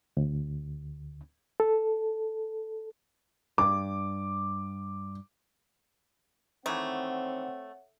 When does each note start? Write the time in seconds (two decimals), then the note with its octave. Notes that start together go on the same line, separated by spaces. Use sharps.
0.17 D2
1.60 A4
3.58 G2 D6
6.66 D#3 E3 A3 C4 C#5 F#5